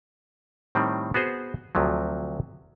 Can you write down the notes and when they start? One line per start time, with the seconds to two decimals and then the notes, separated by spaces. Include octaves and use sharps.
0.75 A2 D#3 G3 C4
1.14 B3 F#4 G#4 C5
1.75 D2 C3 F3 F#3